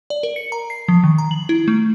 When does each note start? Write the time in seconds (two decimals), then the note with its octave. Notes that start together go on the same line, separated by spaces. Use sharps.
0.10 D5
0.23 A#4
0.36 C#7
0.52 A#5
0.70 C7
0.88 F3
1.04 D#3
1.18 A#5
1.31 F#7
1.49 E4
1.68 A3